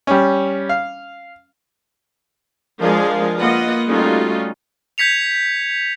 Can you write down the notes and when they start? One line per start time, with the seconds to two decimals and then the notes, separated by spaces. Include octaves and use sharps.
0.07 G3 C#4
0.69 F5
2.80 F3 G#3 D4 G#4 A#4 F5
3.39 A#3 F4 B4 D#5 F#5
3.88 G3 A3 C#4 D#4 F4 F#4
4.98 G6 G#6 B6 C#7 F7